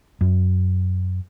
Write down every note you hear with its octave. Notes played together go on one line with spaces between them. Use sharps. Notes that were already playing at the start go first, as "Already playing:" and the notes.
F#2